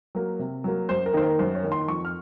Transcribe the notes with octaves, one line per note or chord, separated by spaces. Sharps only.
F#3 A#3
C3
F#3 A#3
F#2 C5
A#4
D#3 A#3 D#4 C5
A#4
F#2 C5
C#5
D#3 A#3 D#4
C6
F2 C#6
F6